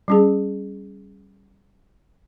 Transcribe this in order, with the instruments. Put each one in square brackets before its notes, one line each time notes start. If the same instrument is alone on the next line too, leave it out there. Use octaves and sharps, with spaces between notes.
[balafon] G3 C#4 G#4